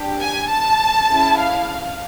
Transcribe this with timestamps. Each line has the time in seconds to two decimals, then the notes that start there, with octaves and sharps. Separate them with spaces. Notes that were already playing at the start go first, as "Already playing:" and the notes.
Already playing: D4 G4
0.20 G#5
0.50 A5
1.09 C#4 E4 G#4
1.39 F5